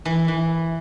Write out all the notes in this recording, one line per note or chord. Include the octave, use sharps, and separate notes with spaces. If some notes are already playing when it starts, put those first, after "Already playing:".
E3
E3